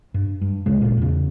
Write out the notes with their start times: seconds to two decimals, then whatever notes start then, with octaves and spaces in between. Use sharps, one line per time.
0.14 G2
0.41 G2
0.66 D2 C#3 G#3
0.82 G#1 A#2
0.98 E2 C#3